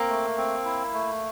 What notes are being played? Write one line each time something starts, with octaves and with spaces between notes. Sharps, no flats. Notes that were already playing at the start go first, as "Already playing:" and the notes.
Already playing: A#3 C4
A3
C4
E4
A3